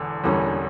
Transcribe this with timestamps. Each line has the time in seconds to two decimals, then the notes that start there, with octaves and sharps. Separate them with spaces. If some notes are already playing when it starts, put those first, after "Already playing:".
Already playing: E1 E2 D3
0.24 E1 E2 D3 G3 C#4